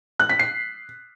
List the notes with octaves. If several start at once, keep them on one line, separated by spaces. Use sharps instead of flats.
F#6
B6
C7